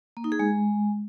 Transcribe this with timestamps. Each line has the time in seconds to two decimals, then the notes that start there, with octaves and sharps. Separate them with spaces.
0.17 A#3
0.24 D#4
0.32 G#4
0.39 G#3